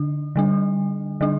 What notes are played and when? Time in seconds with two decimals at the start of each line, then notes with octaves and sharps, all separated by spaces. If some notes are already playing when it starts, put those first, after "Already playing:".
Already playing: D3 D4
0.36 D3 G3 D4
1.21 D3 G3 D4